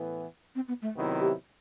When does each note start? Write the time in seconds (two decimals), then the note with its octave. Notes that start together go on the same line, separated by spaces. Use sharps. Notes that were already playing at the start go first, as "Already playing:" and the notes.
Already playing: A2 E3 B3
0.55 C4
0.68 B3
0.82 A3
0.95 C3 D#3 F#3 B3 E4
1.21 G4